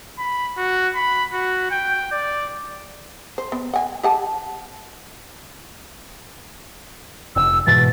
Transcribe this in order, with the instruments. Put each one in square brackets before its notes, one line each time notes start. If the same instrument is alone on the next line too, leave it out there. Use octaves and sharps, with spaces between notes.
[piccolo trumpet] B5
F#4
B5
F#4
G5
D5
[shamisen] C5
B3
F#5 G#5
G4 F#5 A5
[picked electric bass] F1 [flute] E6
[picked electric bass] G#2 B2 E3 [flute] A6